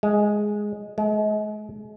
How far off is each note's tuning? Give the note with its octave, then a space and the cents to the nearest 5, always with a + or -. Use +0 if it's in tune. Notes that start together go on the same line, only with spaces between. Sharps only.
G#3 +0
G#3 +35